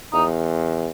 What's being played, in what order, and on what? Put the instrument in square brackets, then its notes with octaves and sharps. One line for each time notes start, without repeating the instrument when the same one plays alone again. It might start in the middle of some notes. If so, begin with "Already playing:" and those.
[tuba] E2 [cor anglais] D#4